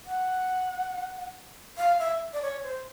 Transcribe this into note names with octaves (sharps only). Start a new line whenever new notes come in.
F#5
F5
E5
D5
C#5
C5